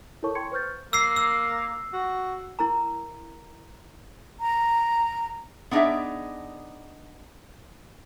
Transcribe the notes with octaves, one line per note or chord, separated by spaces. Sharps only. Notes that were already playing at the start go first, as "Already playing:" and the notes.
E4 A4 A#4 C#5 A5 C#6
G5 C6 C#6 G#6 C#7
B4 C5 C#6 F6 G6 A6
A#3 E6 C7
E6
F#4
E4 A#4 A#5
A#5
B3 D4 D#4 G#4 D5 E5